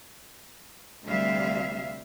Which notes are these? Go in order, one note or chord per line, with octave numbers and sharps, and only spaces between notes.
D2 C3 G3 E5 F5